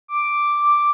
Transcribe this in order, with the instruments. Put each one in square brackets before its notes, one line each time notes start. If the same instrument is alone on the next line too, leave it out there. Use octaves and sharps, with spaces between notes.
[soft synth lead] D6